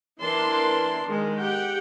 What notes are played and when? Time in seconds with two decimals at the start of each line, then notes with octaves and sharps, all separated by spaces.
0.22 E3 D4 A#4 A5 C6
1.07 D#3 G#3
1.37 G4 F#5 G5